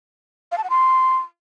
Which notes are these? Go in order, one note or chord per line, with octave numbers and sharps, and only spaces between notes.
F5
A5
F#5
C6